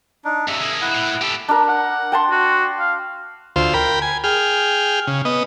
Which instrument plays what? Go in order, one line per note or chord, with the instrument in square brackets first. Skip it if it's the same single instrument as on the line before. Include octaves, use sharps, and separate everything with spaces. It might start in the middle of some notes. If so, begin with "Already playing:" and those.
[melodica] D4 D#4
[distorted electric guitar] G2 C3 [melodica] E5
[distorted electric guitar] A#3 G#4
[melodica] E4 F#5
[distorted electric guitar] A2
G4 A4
[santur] D4 A#4
[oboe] F#5
[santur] G5 A5 C6
[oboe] F#4
F5
[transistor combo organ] D2 F4 C5
A#4 G5 B5
G#5
G#4 G5 F6
C#3
B3 D#5